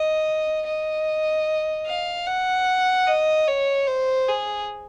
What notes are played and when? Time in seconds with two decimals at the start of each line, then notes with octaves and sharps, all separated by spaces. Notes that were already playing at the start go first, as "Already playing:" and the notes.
Already playing: D#5
0.66 D#5
1.86 F5
2.27 F#5
3.07 D#5
3.48 C#5
3.87 C5
4.29 G#4